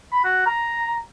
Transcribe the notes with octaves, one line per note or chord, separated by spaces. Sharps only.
B5
F#4
A#5